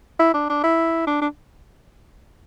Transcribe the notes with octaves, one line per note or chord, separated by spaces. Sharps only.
E4
D4
D4
E4
D4
D4